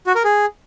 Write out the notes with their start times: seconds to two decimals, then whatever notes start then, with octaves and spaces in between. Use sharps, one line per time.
0.07 F#4
0.15 A#4
0.24 G#4